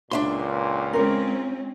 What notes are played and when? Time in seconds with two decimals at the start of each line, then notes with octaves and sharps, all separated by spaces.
0.11 C#2 A#2 D4 E5 C6
0.93 G#3 C4 C#4 F4 A#4